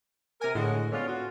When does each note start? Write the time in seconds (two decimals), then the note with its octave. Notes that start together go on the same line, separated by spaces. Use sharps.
0.41 C3 A#4 G#5
0.55 A2 D3 G#3 F#4
0.92 D3 G#3 B3 C#4 F4
1.08 F4 F#4